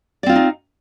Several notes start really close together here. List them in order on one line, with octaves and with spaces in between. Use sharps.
D5 C4 F4 C#4 D#4